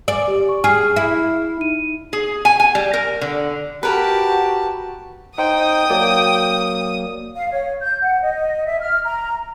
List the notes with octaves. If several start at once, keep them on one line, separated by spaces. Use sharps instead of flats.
D5 G#5
G4
C#6
G#4 F6 C7
E4
D#4 D#7
G#4
G#5
G#5
G3
A#4
D3
F#4 G4 A#4 B4 A5
D#4 C5 G5 D#6
F#3 A#3 D5
F5
C#5
G6
F#5
D#5
E5
F6
A#5